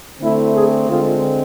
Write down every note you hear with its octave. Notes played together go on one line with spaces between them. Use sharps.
D3 A3 C4 E4
G#4
D3 G#3 C4 F4